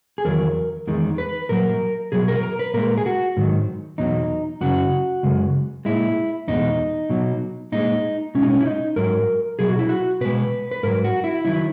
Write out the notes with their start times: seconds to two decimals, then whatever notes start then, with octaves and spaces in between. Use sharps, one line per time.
0.18 G#4
0.25 E2 D#3 F#3 A#4
0.87 E2 D#3 G#3
1.18 B4
1.49 A#2 F#3 A#4
2.12 B2 F#3 G#4
2.28 A#4
2.43 A#4
2.59 B4
2.74 A#2 G#3 A#4
2.98 G#4
3.06 F#4
3.37 G#2 D#3 F#3
3.98 E2 B2 F#3 D#4
4.61 F#2 C#3 F#3 F#4
5.23 F#2 C#3 G#3
5.85 A#2 G#3 E4
6.48 E2 B2 G#3 D#4
7.10 B2 F#3
7.72 A#2 G#3 D#4
8.35 B2 G#3 C#4
8.42 D#4
8.50 C#4
8.61 E4
8.66 D#4
8.96 G#2 F#3 A#4
9.59 B2 F#3 G#4
9.69 F#4
9.79 E4
9.89 F#4
10.21 B2 G#3 B4
10.71 B4
10.83 G#2 F#3 A#4
11.04 F#4
11.24 E4
11.45 D#3 F#3 E4